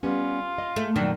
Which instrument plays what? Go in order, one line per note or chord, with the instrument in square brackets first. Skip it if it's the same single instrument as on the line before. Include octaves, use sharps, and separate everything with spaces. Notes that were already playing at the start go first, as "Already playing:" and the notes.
[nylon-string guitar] G3 B3 C#4 [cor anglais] F4
[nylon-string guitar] D#5
[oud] A3 [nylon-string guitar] G#4
[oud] F2 D#3 D4 [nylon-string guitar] A#2 F#3